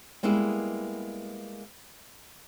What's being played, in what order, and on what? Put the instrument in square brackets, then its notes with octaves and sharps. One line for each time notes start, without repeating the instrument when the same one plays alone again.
[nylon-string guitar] G3 G#3 A#3 B3 E4